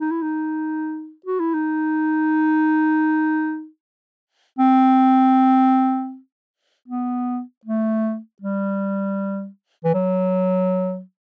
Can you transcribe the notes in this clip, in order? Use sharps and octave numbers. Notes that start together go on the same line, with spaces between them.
D#4
E4
D#4
F#4
E4
D#4
C4
B3
A3
G3
E3
F#3